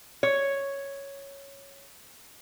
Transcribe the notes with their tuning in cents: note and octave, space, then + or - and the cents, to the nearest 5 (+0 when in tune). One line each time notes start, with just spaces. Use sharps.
C#5 +0